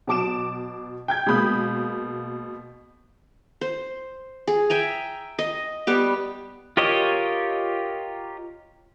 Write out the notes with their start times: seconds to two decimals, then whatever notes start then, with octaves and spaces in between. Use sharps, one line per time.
0.07 B2 F#3 A5 D6 D7 E7
1.08 G5 G6 G#6
1.26 B2 G#3 A#3 B5 D#6 G6
3.61 C5
4.47 G#4
4.70 E5 G5 G#5 A#5
5.39 D#5
5.87 G3 B3 G4
6.77 F4 G4 A#4 C#5 D#5